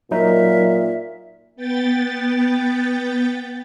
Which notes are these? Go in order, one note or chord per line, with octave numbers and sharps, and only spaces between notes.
A#2 F#3 D#4 A#4 E5
B3 G5 A6